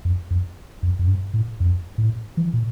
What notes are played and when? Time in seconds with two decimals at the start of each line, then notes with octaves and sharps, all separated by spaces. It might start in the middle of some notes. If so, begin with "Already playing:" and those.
0.05 F2
0.31 F2
0.83 F2
0.99 F2
1.07 G2
1.34 A2
1.60 F2
1.98 A2
2.37 E3
2.53 A#2